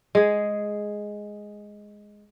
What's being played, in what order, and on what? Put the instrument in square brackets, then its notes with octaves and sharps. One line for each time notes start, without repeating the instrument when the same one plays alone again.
[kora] G#3 G#4